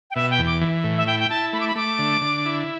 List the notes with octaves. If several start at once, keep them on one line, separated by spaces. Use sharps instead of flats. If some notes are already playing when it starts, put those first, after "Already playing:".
G5
B2 E5
G5
E2
D6
E3
A2
E5
E4 G5
G5
E4 A5
A3 B5
D6
B5
A3 D6
D3
D3
E4